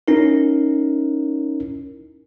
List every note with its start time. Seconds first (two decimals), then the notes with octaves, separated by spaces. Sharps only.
0.08 C#4 D#4 E4 A#4